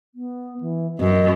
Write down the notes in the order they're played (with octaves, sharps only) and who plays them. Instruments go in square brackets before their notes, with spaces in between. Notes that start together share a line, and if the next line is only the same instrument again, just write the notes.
[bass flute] B3
E3
[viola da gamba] F#2 [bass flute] D#5